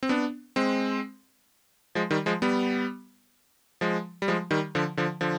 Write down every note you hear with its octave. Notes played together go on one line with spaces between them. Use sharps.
C4
B3 D4
G#3 C4
F3 G#3
D#3 G3
F3 G#3
G3 B3
F3 G#3
G3
F3 G#3
D#3 G3
D3 F3
D3 F3
D3 F3